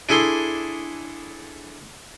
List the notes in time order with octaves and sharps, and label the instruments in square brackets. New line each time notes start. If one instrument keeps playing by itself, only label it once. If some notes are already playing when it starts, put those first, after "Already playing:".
[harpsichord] D4 E4 G#4 A4 C6